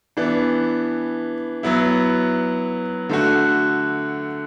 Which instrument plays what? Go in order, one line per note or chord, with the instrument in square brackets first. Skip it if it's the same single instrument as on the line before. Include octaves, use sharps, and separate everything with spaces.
[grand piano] E3 B3 D4
F#3 B3 E4
D3 A3 F#4